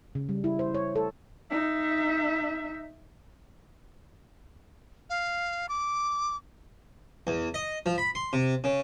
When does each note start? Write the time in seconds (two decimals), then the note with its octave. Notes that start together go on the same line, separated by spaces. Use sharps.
0.15 C#3
0.29 G3
0.44 E4
0.59 C5
0.74 C#5
0.96 A4
1.50 D#4 E5
5.10 F5
5.69 D6
7.27 E2
7.54 D#5
7.86 F3
7.98 B5
8.15 C6
8.33 C3
8.64 C#3